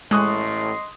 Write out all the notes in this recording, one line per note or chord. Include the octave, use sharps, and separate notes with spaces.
A1 A2 G#3 D#5 C6 C#6 D#6 F#6